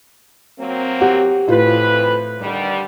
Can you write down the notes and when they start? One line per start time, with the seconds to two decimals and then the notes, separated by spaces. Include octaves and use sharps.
0.60 F#3 A#3 C4
1.01 G4 F#5
1.48 F2 A2 E3 F4 B4
2.40 D3 D#3 G3